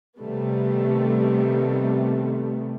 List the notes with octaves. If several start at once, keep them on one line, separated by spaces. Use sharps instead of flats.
C3 D#3 G3 A3 B3